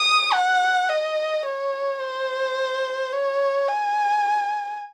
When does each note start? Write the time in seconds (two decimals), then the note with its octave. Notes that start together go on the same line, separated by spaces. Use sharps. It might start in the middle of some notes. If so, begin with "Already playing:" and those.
Already playing: D#6
0.33 F#5
0.89 D#5
1.45 C#5
2.01 C5
3.13 C#5
3.68 G#5